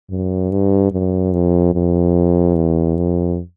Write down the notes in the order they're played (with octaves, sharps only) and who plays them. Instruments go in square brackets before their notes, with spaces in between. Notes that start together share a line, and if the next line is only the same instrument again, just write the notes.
[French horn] F#2
G2
F#2
F2
F2
E2
F2